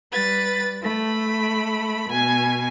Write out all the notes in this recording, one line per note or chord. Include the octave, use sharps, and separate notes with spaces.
G3 B4 A6
A3 B5
B2 G#5